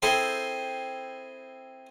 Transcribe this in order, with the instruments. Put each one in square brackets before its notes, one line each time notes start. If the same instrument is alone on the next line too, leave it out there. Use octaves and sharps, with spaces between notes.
[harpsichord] C4 E4 G#4 A4 C5 G5